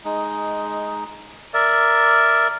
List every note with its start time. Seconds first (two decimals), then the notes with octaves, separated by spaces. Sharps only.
0.05 G#3 D#4
1.54 A#4 D5 E5